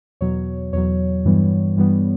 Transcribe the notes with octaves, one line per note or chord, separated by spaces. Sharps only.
E2 B2 F#3 C#5
E2 B2 F#3 C#5
G2 E3 G3 B3
G2 E3 G3 B3